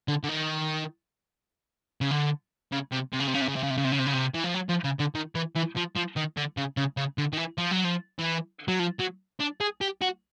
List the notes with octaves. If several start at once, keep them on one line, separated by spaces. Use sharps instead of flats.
D3
D3
D#3
C#3
D3
C#3
C3
C3
C#3
C3
C#3
C3
C#3
C3
C#3
C3
C#3
C3
C#3
C3
C#3
C3
E3
F3
F#3
F3
C#3
D3
D#3
E3
E3
F3
F3
D#3
D3
C#3
C#3
C#3
D3
D#3
E3
F3
F#3
F3
E3
F#3
F3
F#3
D4
G#4
G4
F#4